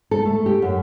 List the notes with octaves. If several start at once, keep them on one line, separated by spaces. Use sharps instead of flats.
A4
A3
G4
F#2